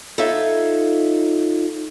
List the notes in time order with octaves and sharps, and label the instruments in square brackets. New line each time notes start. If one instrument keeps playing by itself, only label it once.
[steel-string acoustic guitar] D#4 F4 A4 C#5 E5 F5